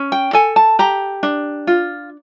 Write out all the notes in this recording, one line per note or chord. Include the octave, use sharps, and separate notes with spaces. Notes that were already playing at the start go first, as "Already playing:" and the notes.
Already playing: C#4
G5
A4 G#5
A5
G4 A#5
D4
F4